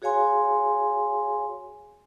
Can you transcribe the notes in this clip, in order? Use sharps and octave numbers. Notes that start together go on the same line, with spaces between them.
F#4 G#4 C#5 F5 G#5 C6